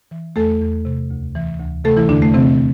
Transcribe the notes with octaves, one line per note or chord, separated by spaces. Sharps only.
E3
E2 A3 A4
E2
C3
D2
E3
D2
C3 A3 A4
E3 E4
E2 D3 D4
A3
C3 E3 C4